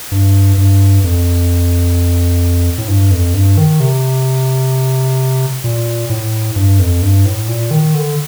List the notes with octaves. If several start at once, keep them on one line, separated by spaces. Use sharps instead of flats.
G2
G2
F2
A2
G2
F2
G2
D#3
C3
A#2
A2
G2
F2
G2
A2
A#2
D#3
D3